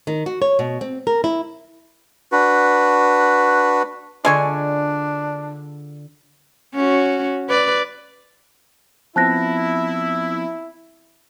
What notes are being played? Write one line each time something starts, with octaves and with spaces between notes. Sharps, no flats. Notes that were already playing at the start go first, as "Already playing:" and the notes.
D#3
F#4
C#5
B2
C4
A#4
E4
D4 F#4 B4
D3 G#3 D4 F4 G#5 C#6
C#4 F#4
B4 D5
F3 B3 C4 E4 A5 F#6 A#6